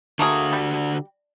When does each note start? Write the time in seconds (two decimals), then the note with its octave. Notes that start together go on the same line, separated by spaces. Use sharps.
0.19 D3 A3 A#3 F#4 G#4
0.53 G3